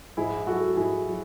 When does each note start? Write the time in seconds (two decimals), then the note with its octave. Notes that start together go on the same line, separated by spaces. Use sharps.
0.17 G#2 E4 G#4
0.46 F#3 F#4 A4
0.76 G#2 E4 G#4
1.07 F#3